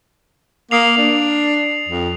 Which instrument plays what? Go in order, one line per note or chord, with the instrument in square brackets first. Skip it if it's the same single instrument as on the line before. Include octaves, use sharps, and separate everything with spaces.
[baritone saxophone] A#3 [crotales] D#6 C7 F7
[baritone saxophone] D4
F2